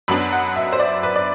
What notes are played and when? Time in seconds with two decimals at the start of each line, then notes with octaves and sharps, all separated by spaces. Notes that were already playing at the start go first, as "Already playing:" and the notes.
0.08 F#2 F#3 B3 D4 B5
0.33 F#5
0.56 E5
0.73 C5
0.79 D5
1.03 B4
1.16 D5